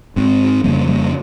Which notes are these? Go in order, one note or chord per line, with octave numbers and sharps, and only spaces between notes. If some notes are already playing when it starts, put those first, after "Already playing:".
G#2 G#3 C4
F2 C#3 G3 A#3
G3 A#3